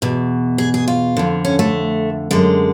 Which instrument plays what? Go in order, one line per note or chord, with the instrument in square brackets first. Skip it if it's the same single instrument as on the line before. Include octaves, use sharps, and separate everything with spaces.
[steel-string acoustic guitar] E2 B2
G#4
G#4
F4
F2 D3
C#4
A3
F#2 D3 G#3